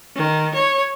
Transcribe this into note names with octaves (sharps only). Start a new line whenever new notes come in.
D#3
C#5